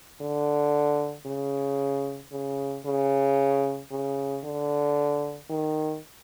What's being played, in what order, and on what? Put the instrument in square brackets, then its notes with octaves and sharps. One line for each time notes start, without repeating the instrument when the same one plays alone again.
[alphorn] D3
C#3
C#3
C#3
C#3
D3
D#3